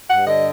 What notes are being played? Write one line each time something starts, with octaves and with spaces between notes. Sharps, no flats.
G2 F#5
D3 D#5